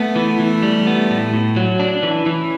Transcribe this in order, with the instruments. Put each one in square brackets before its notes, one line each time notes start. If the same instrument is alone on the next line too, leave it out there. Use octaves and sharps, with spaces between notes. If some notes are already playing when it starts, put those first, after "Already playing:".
Already playing: [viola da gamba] A3 [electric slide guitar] B3
[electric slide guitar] E3
E3
G3
B3
A2
A2
F#3
[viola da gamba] C#4 [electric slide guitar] D4
[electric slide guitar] E3
E3